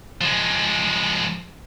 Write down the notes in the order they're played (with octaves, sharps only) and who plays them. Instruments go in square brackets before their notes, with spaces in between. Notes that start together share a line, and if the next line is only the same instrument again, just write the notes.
[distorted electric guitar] F3 G#3